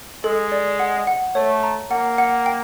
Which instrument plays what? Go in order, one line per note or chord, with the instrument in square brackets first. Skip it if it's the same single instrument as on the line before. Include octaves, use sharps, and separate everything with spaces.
[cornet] G#3 [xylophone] A4
[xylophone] D5
F#5
F#5
[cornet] A3 [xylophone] C#5
[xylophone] A#5
[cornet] A#3 [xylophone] F#5
[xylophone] F#5
G5